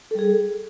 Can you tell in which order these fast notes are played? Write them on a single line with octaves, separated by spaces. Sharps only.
A4 G3 G#4